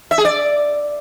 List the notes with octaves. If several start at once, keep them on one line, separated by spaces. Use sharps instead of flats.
E5
G#4
D5